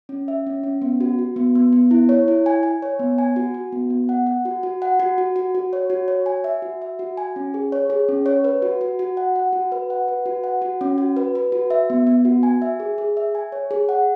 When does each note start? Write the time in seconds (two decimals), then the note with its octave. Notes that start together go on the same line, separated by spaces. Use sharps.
0.09 C#4
0.28 E5
0.47 C#4
0.63 C#4
0.82 B3
1.00 F#4
1.19 F#4
1.36 B3
1.55 B3
1.73 B3
1.91 E4
2.09 C#5
2.28 E4
2.46 G#5
2.63 G#5
2.82 C#5
2.99 B3
3.18 G#5
3.36 F#4
3.54 F#4
3.72 B3
3.90 B3
4.09 F#5
4.27 F#5
4.45 F#4
4.63 F#4
4.82 F#5
5.00 F#4
5.18 F#4
5.36 F#4
5.55 F#4
5.73 C#5
5.90 F#4
6.08 C#5
6.26 G#5
6.44 E5
6.62 F#4
6.82 E5
6.99 F#4
7.17 G#5
7.36 C#4
7.54 G#4
7.72 C#5
7.90 G#4
8.08 C#4
8.26 C#5
8.44 B4
8.62 F#4
8.81 F#4
8.99 F#4
9.17 F#5
9.36 F#5
9.53 F#4
9.72 B4
9.90 F#5
10.08 B4
10.26 F#4
10.44 F#5
10.62 F#4
10.81 C#4
10.98 F#4
11.16 B4
11.35 B4
11.52 F#4
11.70 E5
11.90 B3
12.07 B3
12.25 F#4
12.43 G#5
12.62 E5
12.80 G#4
12.98 G#4
13.17 E5
13.35 G#5
13.52 C#5
13.71 G#4
13.89 F#5